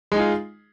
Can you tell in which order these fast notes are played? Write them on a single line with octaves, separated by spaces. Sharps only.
G#3 D#4 G#4 F4